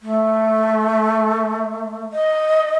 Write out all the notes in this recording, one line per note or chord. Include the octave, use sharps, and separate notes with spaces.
A3
D#5